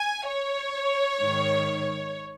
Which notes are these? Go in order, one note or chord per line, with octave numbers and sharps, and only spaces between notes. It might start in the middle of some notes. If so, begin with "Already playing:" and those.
Already playing: G#5
C#5
G#2 D#3